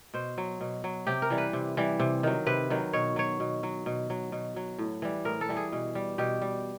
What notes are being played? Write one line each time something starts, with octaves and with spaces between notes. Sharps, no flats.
B2 C5
F#3
B2
F#3
C3 G4
A#4
E3 G3
B4
C3
E3 G3
C3
D#3 F#3
C3 B4
D#3 F#3
B2 C#5
F#3 C#5
B2
F#3
B2
F#3
B2
F#3
A2
E3 G3
A2 A#4
A4
E3 G3
G#4
B2
G3
B2 G4
G3